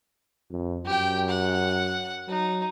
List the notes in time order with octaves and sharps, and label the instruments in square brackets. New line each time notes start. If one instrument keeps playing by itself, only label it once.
[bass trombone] F2
[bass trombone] F#2 [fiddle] G4 G5
[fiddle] F#5
[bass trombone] F#3 [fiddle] D#4